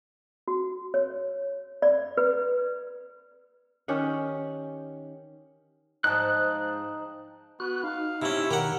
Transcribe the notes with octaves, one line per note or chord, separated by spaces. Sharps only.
F#4
C#5
D5
B4
D#3 C#4 G4 F#5
G#2 F3 D#4 G5 A5 F#6
B3 F#4 F#6
D#4 F5
C3 C#4 E4
B2 D#3 G4 A#4 F#5